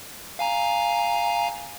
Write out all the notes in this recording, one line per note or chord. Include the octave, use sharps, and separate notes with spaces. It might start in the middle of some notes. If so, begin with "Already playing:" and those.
F5 G#5 A#5